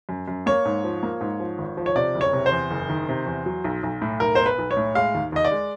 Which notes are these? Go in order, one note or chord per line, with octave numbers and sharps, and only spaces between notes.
F#2
F#2
A#3 C#5
G#2
F3
A#3
G#2
F3
G#1
F3
C#5
C3 D5
F#1
C#5
C3
C5
E2
F#1
D#3
C3
E2
F#3
B1
B1
A2
B1 A#4
B3 C5
B4
B1
C#5
A2
G#3 F5
D#2
D#2 D#5
D5
G#3